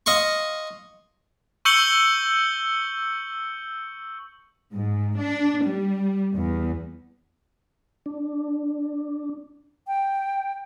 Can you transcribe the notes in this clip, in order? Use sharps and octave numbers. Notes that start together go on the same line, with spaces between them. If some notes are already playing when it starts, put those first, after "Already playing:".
D#5 F5 C6 C#6
C#6 E6 G6 C#7 F#7 G7
G#2
D4
G3
E2
D4
G5